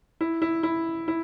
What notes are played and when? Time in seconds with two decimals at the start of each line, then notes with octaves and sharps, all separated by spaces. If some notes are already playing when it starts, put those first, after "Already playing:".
0.21 E4
0.42 E4
0.63 E4
1.08 E4